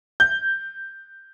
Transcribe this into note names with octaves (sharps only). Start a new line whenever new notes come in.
G6